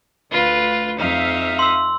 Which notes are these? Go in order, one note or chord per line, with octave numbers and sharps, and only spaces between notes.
D2 F4 B4
F2 D#4 E5 F5
C6 E6